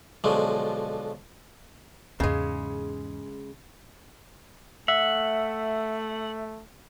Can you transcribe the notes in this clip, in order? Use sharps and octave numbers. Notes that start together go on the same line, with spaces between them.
B1 D3 F3 F#3 G#3
E2 G#2 C#3 G#3
A3 E5 F#5